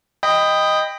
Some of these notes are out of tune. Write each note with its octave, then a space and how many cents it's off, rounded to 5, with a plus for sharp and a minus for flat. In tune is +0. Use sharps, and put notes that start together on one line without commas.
D#5 +0 G5 +15 B5 +20